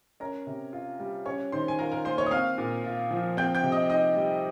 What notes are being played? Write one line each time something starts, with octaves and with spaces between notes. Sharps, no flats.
C#4 A#4 A#5
C3
F4
G3
C#4 C#5 C#6
D#3 C5 C6
G#5
F4 A#4 A#5
A#4 A#5
A#3 C5 C6
C#5 C#6
D#6
C4 F5 F6
A#2
F4
F3
C4 G5 G6
G5 G6
C3
D#5 D#6
D#4 D#5 D#6
G3